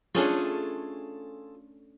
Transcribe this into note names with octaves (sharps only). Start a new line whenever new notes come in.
A3 C#4 D4 F4 G#4 A4